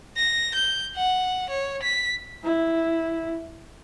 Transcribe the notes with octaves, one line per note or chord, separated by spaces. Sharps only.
A#6
G6
F#5
C#5
B6
E4